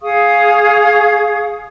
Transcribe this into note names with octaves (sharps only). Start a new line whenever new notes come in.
G#4 F5 C#6 D#6